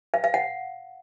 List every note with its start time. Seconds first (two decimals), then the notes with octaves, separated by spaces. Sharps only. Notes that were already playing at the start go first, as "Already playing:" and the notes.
0.14 F5
0.24 F5
0.34 F#5